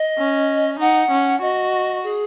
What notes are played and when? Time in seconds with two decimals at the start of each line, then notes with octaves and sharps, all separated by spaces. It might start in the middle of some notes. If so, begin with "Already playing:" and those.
Already playing: D#5
0.18 C#4
0.79 D#4 F#5
1.11 C#4
1.42 F#4 D#5
2.03 G#4